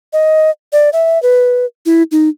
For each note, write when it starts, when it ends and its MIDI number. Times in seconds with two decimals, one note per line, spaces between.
0.13 0.50 75
0.73 0.90 74
0.93 1.21 76
1.23 1.66 71
1.86 2.03 64
2.12 2.29 63